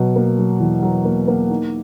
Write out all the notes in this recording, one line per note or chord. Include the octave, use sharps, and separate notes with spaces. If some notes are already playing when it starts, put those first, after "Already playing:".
Already playing: B2 F#3
A#3
F#3
E2
F#3
A#3
A#3
D#4